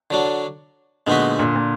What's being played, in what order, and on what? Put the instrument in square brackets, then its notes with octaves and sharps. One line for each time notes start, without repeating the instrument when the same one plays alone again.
[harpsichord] D3 F#3 D4
[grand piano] A#2 D3 [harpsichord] G#3 B3 D#4 F#4 B4
[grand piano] A#2 D3
A#2